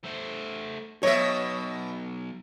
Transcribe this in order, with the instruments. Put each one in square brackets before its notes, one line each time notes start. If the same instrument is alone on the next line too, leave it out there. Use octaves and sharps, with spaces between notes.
[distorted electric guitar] A3 C5
[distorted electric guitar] B1 [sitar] B2 E5 [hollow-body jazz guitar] C#5